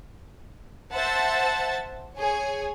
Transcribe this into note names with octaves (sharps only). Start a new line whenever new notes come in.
C5 E5 F#5 A5 E6 A6
G#4 C#5 G#5